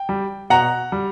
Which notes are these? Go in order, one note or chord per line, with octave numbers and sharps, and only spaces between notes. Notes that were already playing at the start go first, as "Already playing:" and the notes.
Already playing: G5
G3
B2 F#5 A#5
G3